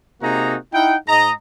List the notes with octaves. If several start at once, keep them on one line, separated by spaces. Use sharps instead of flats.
C3 A#3 D#4 F#4 G#4 A#5
D#4 E4 F#5 G5
G#2 D#5 A#5